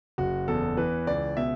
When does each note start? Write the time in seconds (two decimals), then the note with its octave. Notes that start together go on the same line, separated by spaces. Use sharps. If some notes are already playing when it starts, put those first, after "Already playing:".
0.18 F#1 F#4
0.48 E2 A4
0.77 E3 B4
1.07 C#2 D5
1.37 B2 E5